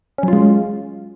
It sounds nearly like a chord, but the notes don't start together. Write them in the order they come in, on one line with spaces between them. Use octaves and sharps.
C#4 F#3 F4 G#3